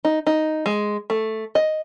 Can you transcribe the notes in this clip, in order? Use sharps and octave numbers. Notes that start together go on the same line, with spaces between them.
D#4
D#4
G#3
A3
D#5